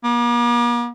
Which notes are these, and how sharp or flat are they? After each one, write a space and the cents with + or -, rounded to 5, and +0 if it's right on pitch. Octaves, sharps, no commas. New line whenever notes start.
A#3 +45